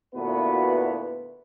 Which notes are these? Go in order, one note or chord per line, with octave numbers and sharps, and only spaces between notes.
D2 A#2 B3 E4 F#4 B4